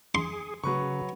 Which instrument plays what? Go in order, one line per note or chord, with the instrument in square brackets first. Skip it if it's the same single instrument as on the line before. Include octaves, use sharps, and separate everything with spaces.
[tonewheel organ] G#4 [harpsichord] C6
[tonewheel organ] C#3 [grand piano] F#3 B4 C#6